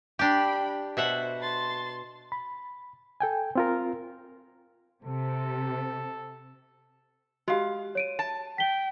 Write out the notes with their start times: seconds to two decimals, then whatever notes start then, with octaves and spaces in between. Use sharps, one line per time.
0.19 D4 G4 G5 B5
0.97 B2 C5 E5 F#5
1.40 A5 C6 A6
2.32 B5
3.20 A4 G5 G#5
3.55 C4 F4 A#4
5.05 C3 A4
7.48 G#3 F#4 G4 F5
7.95 C#5 D7 D#7
8.19 A5
8.58 G5 B6 G7